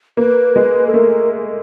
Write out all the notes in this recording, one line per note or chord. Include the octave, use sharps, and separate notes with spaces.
A#3 B4
G#3
A4
A3 A#4